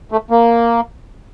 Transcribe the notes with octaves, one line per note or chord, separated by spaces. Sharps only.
A3
A#3